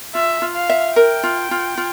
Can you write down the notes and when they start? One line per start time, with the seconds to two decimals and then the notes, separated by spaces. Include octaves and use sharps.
0.15 F4 E5
0.42 F4
0.55 F5
0.69 E5
0.96 A#4 G5
1.23 F4
1.51 F4
1.77 F4